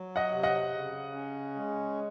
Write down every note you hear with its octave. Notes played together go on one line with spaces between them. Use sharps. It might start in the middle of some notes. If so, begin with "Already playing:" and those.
Already playing: F#3
D#5 F#5
C3
D#5 F#5
C#3
C#4
G#3